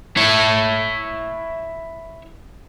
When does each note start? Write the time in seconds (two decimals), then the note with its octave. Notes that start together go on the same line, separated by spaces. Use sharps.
0.17 E4 C#5